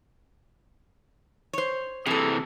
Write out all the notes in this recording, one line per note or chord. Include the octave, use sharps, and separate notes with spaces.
C5 C#5
C3 E3 G#4 A4